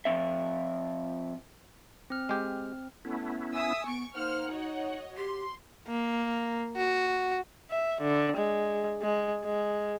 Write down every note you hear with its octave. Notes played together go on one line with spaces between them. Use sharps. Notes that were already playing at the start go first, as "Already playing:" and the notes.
F2 E3 F3 C4 E5
C4 F6
G#3 G4
A3 B3 C#4 E4
E5 G#5 D#6 E6
B3 C#6 D7
A#3 D#4 C5 F#5 F6
F#4 C#5 D#5
G4 C6
A#3
F#4
E5
D3
G#3
G#3
G#3